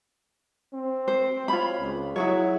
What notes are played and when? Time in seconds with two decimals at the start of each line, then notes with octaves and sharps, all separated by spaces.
0.74 C4
1.08 C5
1.48 F4 C#5 B5
1.79 C#2
2.16 F#3 E4 G#4 C#5